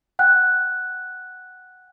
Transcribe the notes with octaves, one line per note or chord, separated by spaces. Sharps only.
F#5 G5 F#6